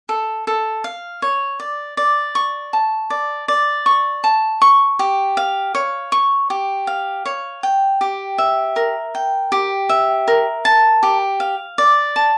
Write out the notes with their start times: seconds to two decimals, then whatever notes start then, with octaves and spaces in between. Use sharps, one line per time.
0.09 A4
0.47 A4
0.84 F5
1.22 C#5
1.60 D5
1.97 D5
2.35 C#6
2.73 A5
3.10 D5
3.48 D5
3.86 C#6
4.24 A5
4.62 C#6
4.99 G4
5.37 F5
5.75 C#5
6.12 C#6
6.50 G4
6.87 F5
7.25 C#5
7.63 G5
8.01 G4
8.38 E5
8.76 A#4
9.15 G5
9.52 G4
9.89 E5
10.28 A#4
10.65 A5
11.03 G4
11.40 F5
11.78 D5
12.16 A5